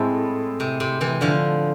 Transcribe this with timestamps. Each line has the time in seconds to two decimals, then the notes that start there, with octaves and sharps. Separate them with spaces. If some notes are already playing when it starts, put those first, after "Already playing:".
Already playing: A2 G#3 C4 E4 A4
0.60 C3
0.80 C3
1.01 C3 E3
1.21 D3 F3